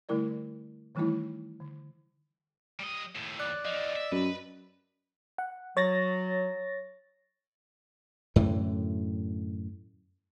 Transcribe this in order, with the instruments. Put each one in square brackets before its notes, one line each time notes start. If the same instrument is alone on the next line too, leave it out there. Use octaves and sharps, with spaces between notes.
[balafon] D3 G3 A3 E4 A#4 D5
D#3 E3 G3 A3 D#4 E4
D3
[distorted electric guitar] G3 D#5
D#2 A2
[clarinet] D5 [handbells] D6 F#6
[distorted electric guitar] E2 F3 [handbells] D#5
[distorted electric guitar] E5
[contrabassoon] F#2 [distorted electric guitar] B4
[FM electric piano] F#5
[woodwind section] F#3 [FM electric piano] C#5 A6 A#6
[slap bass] F#2 A2 D3 E3